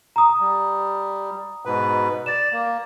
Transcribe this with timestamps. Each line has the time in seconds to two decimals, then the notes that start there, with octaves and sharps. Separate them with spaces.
0.16 A#5 D#6
0.40 G3
1.65 G#2 B2 B4
2.26 D5 A6 E7
2.52 A#3